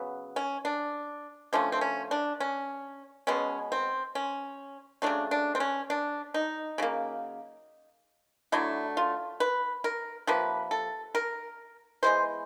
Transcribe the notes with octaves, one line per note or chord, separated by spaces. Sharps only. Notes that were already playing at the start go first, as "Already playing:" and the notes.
Already playing: C#3 F#3 B3
C#4
D4
D3 F3 A3 C#4
C4
C#4
D4
C#4
B2 G#3 B3 C#4
C4
C#4
C#3 F#3 A3 D4
D4
C4
C#4
D4
D#4
C#3 F#3 A#3
D3 F#3 A3 E4
F4
B4
A#4
C3 F3 A#3 B4
A4
A#4
E3 G#3 B3 C5